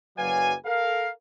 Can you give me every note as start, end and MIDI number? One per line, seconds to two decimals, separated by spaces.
0.18 0.55 30
0.18 0.55 54
0.18 0.55 71
0.18 0.55 74
0.18 0.55 77
0.18 0.55 80
0.66 1.10 69
0.66 1.10 70
0.66 1.10 77